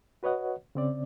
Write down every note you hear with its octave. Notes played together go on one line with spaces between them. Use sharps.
F#4 B4 C#5 D#5 F#5
C#3 C4 D5